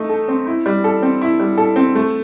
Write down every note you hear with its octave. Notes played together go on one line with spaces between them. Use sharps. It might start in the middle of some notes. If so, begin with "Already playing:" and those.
Already playing: A3 D#4
A4
C4
E4
G3
A4
C4
E4
G3
A4
C4
A3